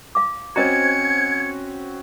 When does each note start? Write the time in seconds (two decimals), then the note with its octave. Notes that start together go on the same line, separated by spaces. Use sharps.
0.15 F5 D6
0.56 C4 C#4 F#4 C5 D#5 A#5 G#6 C#7